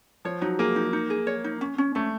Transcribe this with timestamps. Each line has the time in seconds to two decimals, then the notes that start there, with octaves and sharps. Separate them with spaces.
0.25 F3 C#5
0.41 F#3 D#4
0.59 A#3 G#4
0.76 D#4
0.93 D#4
1.10 G#4
1.27 C#5
1.44 D#4
1.61 C#4
1.78 C#4
1.95 A3 C#4